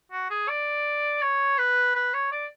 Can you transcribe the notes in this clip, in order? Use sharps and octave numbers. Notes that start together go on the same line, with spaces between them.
F#4
G#4
D5
C#5
B4
B4
C#5
D5